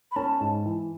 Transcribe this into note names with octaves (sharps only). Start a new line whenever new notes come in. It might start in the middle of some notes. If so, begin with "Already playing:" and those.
B5
C#4 A5
G#2
E3